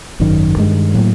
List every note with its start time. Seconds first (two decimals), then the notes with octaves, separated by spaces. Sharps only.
0.20 G#1 F#2 D#3
0.57 G2 D#3 G#3
0.94 A2 F#3 A#3